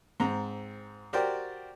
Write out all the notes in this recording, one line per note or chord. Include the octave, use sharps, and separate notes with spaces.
G#2 C4 A#5
F#4 G4 A#4 C5 D5 G5